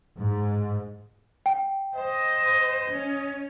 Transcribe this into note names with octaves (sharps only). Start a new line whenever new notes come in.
G#2
G5
C5 D#5
C#4